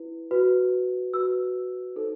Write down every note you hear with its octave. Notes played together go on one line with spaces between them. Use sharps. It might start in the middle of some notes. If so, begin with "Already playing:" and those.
Already playing: E4 B4
F#4 B4
F#4 B4 E6
D#4 A4 C5